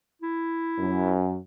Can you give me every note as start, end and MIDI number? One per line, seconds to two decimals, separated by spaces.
0.22 1.14 64
0.78 1.38 42